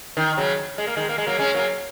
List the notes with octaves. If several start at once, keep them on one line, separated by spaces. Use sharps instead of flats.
D#3
C#3 F#3
G#3
A#3
D#3 G#3
A#3
G#3
F#3 A#3
G#3 C#4
F#3 A#3